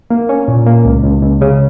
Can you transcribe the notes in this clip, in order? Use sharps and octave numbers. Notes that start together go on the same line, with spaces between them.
A#3
C#4
A#2
A#3
C#2
C#2
C#2
C#3